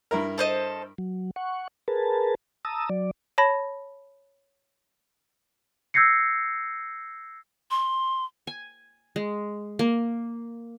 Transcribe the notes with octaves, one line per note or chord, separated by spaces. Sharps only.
G2 E4 A#4
A4 C5 D#5
F#3
F#5 C#6
G#4 A#4 B4 A5
A5 A#5 D#6 E6
F#3 D5
C#5 A5 B5 A#6
E6 G6 G#6 A#6 C7 C#7
C6
G#5
G#3
A#3